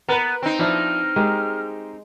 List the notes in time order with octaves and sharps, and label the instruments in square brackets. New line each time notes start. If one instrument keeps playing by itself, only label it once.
[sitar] B3 [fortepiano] A#4 B4
[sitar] C4 D#4
[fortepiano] F3 D4 E4 [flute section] A#5 F6
[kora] G#3 [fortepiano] G4 G#4 A#4